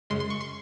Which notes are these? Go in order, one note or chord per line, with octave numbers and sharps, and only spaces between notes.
F#2 C#3 G#3 C6
C6
C#6
C6